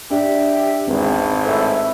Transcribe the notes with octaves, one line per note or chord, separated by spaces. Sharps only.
D4 G4 E5
G#1 E2 G#3 C4
A2 B4 C#5 E5